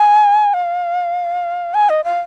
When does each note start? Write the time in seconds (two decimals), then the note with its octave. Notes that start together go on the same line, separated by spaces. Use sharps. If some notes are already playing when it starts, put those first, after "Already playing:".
Already playing: G#5
0.54 F5
1.74 G#5
1.89 D#5
2.04 F5